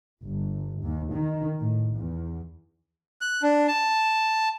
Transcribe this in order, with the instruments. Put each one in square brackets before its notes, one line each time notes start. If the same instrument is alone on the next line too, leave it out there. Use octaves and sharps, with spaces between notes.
[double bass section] G1
D#2
D#3
A2
E2
[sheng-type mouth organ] F#6
D4
A5